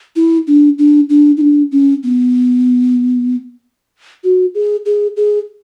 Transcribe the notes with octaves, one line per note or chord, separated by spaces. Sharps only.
E4
D4
D4
D4
D#4
D4
C#4
B3
F#4
G#4
G#4
G#4